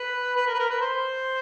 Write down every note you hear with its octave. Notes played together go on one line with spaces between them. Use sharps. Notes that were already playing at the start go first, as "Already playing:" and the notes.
Already playing: B4
B4
A#4
B4
A#4
B4
C5